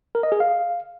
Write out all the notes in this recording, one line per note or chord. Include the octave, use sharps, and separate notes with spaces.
A#4
D#5
G#4
F5